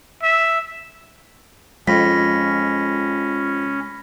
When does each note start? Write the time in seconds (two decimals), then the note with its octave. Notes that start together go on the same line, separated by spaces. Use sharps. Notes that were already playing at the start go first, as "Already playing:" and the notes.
0.23 E5
1.88 F2 G#3 C#4 B5 A#6 B6